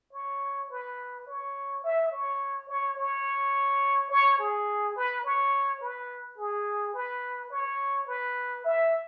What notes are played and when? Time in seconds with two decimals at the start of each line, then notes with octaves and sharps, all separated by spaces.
0.13 C#5
0.70 B4
1.27 C#5
1.84 E5
2.11 C#5
2.69 C#5
2.97 C#5
4.10 C#5
4.39 G#4
4.96 B4
5.24 C#5
5.81 B4
6.38 G#4
6.94 B4
7.51 C#5
8.07 B4
8.64 E5